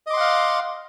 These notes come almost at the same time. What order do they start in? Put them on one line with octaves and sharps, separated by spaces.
D#5 D6 C6 F#5 F5